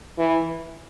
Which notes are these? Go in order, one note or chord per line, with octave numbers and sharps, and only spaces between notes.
E3